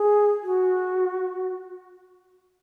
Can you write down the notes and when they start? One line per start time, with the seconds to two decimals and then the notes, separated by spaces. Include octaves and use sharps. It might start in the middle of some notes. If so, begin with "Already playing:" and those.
Already playing: G#4
0.43 F#4